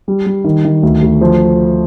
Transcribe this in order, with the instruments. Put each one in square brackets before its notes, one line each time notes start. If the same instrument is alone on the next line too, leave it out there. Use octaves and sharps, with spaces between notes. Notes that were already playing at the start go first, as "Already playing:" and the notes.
[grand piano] G3
G3
D#3
D#3
D2
D2
F3